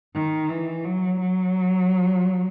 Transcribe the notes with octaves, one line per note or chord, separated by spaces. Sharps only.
D#3
E3
F#3
F#3